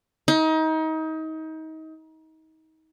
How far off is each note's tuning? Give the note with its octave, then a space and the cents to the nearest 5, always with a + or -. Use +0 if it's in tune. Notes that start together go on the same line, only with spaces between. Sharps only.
D#4 +30